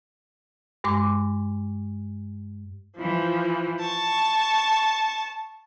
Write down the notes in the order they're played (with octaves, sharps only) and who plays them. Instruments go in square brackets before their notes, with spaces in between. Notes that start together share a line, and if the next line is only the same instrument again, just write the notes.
[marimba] G2 G#3 C6 D6
[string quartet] E3 F3
A5 C#6